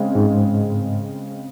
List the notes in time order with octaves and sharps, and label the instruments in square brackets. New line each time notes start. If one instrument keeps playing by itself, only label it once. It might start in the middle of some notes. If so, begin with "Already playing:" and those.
Already playing: [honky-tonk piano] C#3 G#3 C4
[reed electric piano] G#2